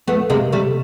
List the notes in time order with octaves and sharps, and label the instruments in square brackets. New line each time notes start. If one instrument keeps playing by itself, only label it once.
[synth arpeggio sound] F2 [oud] A3 B3
[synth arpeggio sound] C3 [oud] G#3 A#3
[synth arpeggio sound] C3 [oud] G3 A3